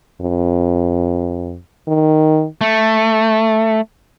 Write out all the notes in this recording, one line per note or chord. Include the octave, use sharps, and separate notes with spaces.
F2
D#3
A3